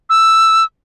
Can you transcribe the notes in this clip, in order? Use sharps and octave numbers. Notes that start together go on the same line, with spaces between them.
E6